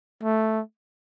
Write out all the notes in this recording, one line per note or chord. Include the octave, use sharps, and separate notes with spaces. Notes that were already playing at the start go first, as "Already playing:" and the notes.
A3